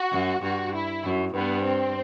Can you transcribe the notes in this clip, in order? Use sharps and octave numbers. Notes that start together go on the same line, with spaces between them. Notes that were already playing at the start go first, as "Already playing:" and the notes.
Already playing: F#4
F#2
G2 F#4
E4
F#2
G2 B3
C4